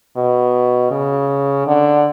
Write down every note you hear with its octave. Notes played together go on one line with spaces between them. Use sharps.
B2
C#3
D3